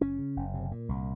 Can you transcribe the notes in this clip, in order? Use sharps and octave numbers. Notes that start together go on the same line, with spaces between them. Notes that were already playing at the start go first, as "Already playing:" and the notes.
F#1 C#4
C#3
F#1
C3
A#2
C2